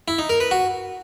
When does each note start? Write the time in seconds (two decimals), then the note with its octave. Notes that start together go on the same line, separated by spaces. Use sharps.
0.08 E4
0.19 D#4
0.29 A#4
0.40 B4
0.51 F#4